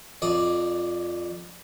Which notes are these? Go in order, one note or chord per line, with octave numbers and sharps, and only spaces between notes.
F2 D5 D#6